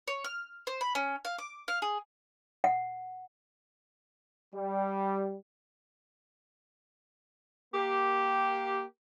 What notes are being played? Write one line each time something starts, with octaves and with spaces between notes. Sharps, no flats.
C#5
F6
C5
B5
C#4
F5
D6
F5
G#4
F#5
G3
A#3 G4